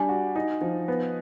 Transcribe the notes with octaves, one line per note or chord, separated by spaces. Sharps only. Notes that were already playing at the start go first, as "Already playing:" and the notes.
Already playing: G3 D4 G#5
F#4
D#4
F3
B3